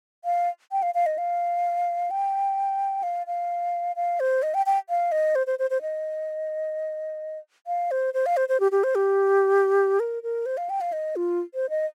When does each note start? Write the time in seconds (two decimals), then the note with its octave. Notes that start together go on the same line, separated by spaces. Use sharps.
0.25 F5
0.72 G5
0.82 F5
0.95 F5
1.06 D#5
1.18 F5
2.11 G5
3.03 F5
3.27 F5
3.96 F5
4.20 C5
4.43 D#5
4.54 G5
4.66 G5
4.89 F5
5.12 D#5
5.35 C5
5.47 C5
5.59 C5
5.70 C5
5.82 D#5
7.67 F5
7.91 C5
8.14 C5
8.26 F5
8.37 C5
8.49 C5
8.60 G4
8.72 G4
8.84 C5
8.95 G4
10.00 A#4
10.23 A#4
10.46 C5
10.57 F5
10.70 G5
10.81 F5
10.93 D#5
11.16 F4
11.55 C5
11.70 D#5